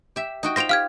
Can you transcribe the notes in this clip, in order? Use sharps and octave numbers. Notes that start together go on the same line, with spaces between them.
G4 E5
D#4 F#4 G5
F4 C5 G5 A#6 F7
G4 F5 F6 G#6